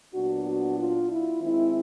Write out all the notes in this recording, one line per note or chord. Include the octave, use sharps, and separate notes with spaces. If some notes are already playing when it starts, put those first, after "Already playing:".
A#2 F#3 B3 D4 F#4
F#4
F4
E4
D#3 G#3 C4 E4